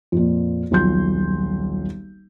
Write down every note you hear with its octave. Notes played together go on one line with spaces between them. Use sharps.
F2 A#2
D#1 B1 F3 C6 G6